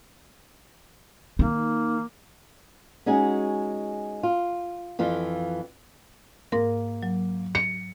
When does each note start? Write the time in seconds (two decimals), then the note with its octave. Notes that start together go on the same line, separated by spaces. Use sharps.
1.39 D#3 A#3 D#4
3.06 G#3 C#4 D#4 F#4 G#4
4.23 F4
4.99 F2 E3 F4
6.52 G#2 A#3 A#4 A#6
7.03 F#3
7.55 C#7